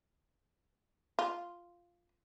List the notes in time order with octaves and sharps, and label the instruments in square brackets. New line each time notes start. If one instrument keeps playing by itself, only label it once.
[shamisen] F4